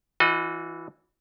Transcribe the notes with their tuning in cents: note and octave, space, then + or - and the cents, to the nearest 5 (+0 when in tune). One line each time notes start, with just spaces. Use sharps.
E3 +0 F#4 -40 D#5 +0